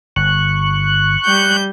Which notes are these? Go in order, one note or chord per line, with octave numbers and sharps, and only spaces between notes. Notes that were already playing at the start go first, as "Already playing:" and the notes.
G1 C#6 F#6
G3 G6